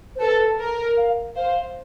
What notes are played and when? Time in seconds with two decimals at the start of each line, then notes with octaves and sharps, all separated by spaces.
0.16 C5
0.20 A4 B4
0.59 A#4
0.97 F5
1.36 C5 F5